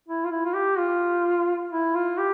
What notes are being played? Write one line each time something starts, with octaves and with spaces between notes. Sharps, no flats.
E4
F4
E4
F4
G4
F4
E4
F4
G4